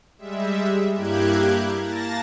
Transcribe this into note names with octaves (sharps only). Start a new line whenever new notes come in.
G3 G#3 E5
G2 A#3 E4 G4 F#6 G#6
A#3 A5 A6 A#6